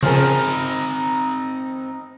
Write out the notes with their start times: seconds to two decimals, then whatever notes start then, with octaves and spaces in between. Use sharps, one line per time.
0.03 C#3 F3 C4 D#4 G#4 A#4